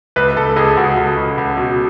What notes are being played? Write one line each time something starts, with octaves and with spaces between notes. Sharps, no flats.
C#2 B4
C#2 A4
C#2 G#4
C#2 F#4
C#2
C#2
C#2
B2